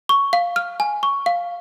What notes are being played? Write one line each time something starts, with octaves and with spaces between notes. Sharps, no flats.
C#6
F5
F6
G#5
C#6
F5